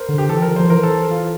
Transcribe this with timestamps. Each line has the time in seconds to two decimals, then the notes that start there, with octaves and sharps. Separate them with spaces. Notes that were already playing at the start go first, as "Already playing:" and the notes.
Already playing: A#4 C5
0.09 D3
0.18 G4
0.29 E3 A4
0.39 F3 A#4
0.56 C5
0.60 F3
0.70 E3 A#4
0.83 A4
1.11 F4